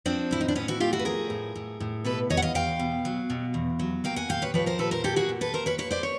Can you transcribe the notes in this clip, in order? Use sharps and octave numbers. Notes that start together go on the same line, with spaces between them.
F3 C4 D4
A2 E4
D#4
D4
A2 B3 C#4
E4 F#4
A3 F4 G4
E4 F#4
B4
F3 G#4 A#4
A2
A2
A2
B2 A4 B4
E2 C#5 D#5
F#5
D#5 F5
E2 F5 G5
B2
F#3
B2
E2
F#3
A#3 F5 G5
F#5 G#5
A#2 F5 G5
B4 C#5
F3 B4 C#5
A#4 C5
A#2 A4 B4
A#4 C5
A#3 G4 A4
F#4 G#4
A#2
A4 B4
A#2 A#4 C5
B4 C#5
A#3 B4 C#5
C5 D5
C#5